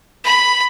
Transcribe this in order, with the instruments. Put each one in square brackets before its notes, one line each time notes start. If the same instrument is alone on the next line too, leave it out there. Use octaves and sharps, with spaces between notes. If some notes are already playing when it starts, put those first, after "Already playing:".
[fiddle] B5